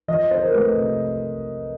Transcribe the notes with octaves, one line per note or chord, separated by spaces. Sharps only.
F3 D#5
C4 C5
A#4
A3 B4
C3